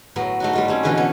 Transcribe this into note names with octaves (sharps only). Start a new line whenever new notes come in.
A2 F#3 B3
A3 D#4 F#4
G3 A3 F4
G3 C4 C#4
B2 D3 E3 F3 G#4 B4
B3 C#4 A4